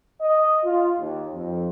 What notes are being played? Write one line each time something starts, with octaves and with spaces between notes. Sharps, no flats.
D#5
F4
D#2
F2